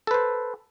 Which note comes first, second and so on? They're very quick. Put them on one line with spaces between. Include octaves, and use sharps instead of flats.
A4 B4 C5